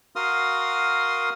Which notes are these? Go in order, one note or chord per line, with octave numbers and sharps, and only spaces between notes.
F#4 A#4 F5 C6 D#6 F6